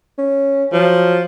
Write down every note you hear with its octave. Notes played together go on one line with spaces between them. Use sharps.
C#4
F3 F#3